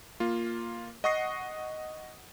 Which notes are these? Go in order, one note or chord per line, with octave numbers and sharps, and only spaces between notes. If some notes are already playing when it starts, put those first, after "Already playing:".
A#3 F4
D#5 F#5 C#6 D#6 A#6 C7